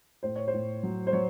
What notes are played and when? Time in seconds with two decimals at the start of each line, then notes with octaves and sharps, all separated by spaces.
0.23 A2 C5
0.36 C#5
0.48 C5
0.53 A2
0.83 F#3
1.07 C5
1.13 F#3 C#5